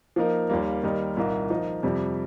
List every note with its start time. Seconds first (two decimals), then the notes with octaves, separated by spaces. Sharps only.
0.16 F3 A#3 D#4 A#4
0.50 D#2 D#3 G3 A#3
0.83 D#2 D#3 G3 D#4 A#4
1.17 C2 A#2 A#3 D#4 A#4
1.50 F3 D#4 A#4
1.83 F2 C3 G3